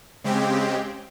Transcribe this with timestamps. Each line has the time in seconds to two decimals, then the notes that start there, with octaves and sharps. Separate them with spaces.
0.24 C#3 G#3 C4 G4